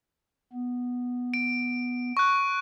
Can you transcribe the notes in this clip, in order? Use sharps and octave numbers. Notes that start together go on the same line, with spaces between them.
B3
D7
C#6 F#6